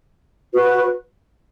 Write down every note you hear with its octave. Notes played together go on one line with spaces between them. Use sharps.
F#4 B4